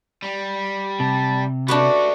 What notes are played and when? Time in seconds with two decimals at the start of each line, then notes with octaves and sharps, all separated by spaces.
0.22 G3
1.00 C3 A5
1.68 D3 A3 D4 F#4 G4 B4